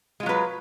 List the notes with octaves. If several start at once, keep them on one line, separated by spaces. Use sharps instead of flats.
F#3 G#3 F4 B4